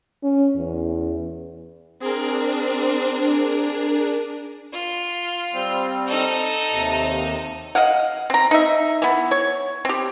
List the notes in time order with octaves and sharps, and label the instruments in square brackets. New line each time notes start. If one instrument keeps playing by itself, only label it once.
[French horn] C#4
E2
[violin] C4 [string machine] D4 [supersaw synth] G#4 A#4
[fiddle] F4
[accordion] G3 C4
[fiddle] D#4 A4
[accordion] D#2 C3
[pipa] D#5 F5 F#5
C4 A#5
D#4 E5
E3 B3
C#5
C4 G4